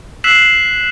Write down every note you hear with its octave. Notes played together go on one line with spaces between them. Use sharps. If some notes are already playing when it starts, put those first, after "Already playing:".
E6 F#6 B6 C7 E7 F#7